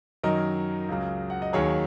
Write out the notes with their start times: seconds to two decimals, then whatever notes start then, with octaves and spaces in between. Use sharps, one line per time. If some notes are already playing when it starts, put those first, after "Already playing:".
0.23 F#2 D#3 F#3 A#4 D#5
0.89 C#2 C#3 F#3
1.30 F#5
1.42 D#5
1.53 D#2 D#3 F#3 G#4 C#5